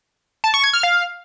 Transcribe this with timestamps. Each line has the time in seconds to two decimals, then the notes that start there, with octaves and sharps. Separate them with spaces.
0.44 A5
0.54 C#6
0.64 G#6
0.73 F6
0.83 F5